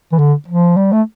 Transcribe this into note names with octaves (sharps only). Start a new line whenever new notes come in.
E3
D3
F3
G3
A3